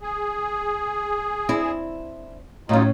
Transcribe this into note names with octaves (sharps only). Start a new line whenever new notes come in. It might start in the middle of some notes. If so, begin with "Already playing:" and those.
G#4
C4 D4 E4
A2 F#3 C#4 D#4 F4